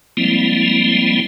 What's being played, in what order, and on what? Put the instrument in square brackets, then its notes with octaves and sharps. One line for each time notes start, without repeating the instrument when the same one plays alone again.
[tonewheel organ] F3 G3 G#3 A#3 C4 E4